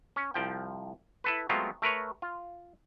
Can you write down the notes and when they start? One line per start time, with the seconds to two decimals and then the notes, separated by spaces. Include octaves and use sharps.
0.16 C#4
0.34 C2 F3 G5
1.24 E4 A4 B4
1.49 F#3 G#3 A3 B3 C4 F4
1.82 A3 A#4 B4 C#5
2.22 F4